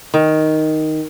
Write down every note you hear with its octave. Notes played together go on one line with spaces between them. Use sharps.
D#3